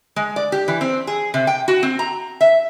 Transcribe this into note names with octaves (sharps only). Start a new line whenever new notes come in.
G#3
D5
G4
E3
C4
G#4
C3
G5
F#4
C4
A#5
E5